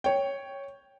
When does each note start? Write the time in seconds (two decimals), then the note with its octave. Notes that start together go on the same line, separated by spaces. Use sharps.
0.04 C#5 G5